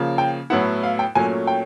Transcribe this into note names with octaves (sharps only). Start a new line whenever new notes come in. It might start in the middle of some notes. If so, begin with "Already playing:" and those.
Already playing: C#3 F3 A#3
G5
A2 F#3 B3 E4 F#5
F5
G5
A#2 F#3 A3 C#4 G#5
G5